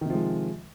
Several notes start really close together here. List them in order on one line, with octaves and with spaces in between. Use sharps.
D#3 C3 F3 G#3